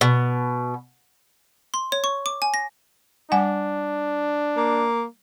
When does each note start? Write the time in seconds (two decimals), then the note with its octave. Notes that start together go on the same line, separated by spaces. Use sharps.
0.01 B2
1.74 C6
1.92 C#5
2.04 C#6
2.26 D6
2.42 G#5
2.54 A#6
3.32 G3 D4 F#5 G#5
4.57 A#3